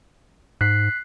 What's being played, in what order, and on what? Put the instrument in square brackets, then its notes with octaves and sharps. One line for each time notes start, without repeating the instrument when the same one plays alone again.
[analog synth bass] G#2 [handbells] F#6 B6 C7